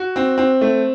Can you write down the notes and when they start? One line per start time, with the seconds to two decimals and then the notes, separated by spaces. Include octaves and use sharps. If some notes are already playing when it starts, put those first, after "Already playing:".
Already playing: F#4
0.16 C4
0.38 C4
0.61 A3